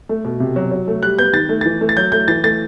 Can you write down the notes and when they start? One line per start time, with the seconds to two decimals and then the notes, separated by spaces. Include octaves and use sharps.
0.09 A3
0.25 B2
0.40 C3
0.56 F#3
0.71 F#3
0.87 A3
1.02 G3 F#6
1.19 B3 G6
1.33 D#3 A6
1.49 A3
1.61 E3 A6
1.81 A3
1.89 A6
1.97 F#3 G6
2.12 A3 G6
2.28 E3 A6
2.44 A3 A6